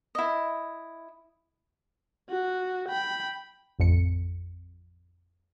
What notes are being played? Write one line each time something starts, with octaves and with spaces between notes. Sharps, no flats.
E4 D#5
F#4
G5 B5
A1 F2 C#7